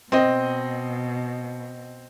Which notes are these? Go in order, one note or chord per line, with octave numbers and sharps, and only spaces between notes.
B2 C4 D#5